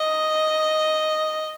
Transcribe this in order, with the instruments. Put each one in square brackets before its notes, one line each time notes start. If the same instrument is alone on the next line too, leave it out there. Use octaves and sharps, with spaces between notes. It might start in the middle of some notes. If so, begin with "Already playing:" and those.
Already playing: [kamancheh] D#5